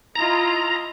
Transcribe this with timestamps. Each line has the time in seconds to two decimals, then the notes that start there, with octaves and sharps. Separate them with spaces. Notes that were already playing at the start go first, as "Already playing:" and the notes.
0.16 E4 F4 D#5 A#5